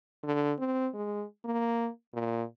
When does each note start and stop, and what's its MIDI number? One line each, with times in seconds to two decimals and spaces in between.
0.23 0.53 50
0.59 0.87 60
0.94 1.24 56
1.45 1.89 58
2.14 2.44 46